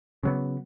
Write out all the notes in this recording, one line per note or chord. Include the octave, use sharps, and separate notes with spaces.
C#3 F#3 B3